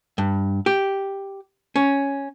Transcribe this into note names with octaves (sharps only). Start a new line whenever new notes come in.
G2
G4
C#4